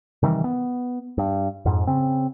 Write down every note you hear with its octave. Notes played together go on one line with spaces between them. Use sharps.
C3 D#3 E3 G3
B3
G2
F2 G#2
C#3 C4